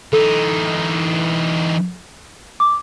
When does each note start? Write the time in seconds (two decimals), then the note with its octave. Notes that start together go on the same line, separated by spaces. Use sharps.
0.13 E3 D#4 A4
2.60 D6